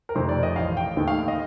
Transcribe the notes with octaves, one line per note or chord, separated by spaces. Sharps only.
A#4
F2 C3 D#3 A3 C5
D5
D#5
A1 A2 A3 F5
G5
D#2 D#3 A3
F5
D#5